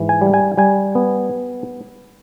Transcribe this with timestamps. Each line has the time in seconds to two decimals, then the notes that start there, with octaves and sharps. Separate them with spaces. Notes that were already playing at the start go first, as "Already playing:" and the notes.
Already playing: G#2 E3
0.09 G#5
0.21 G3
0.34 G#5
0.58 G3 G#5
0.95 B3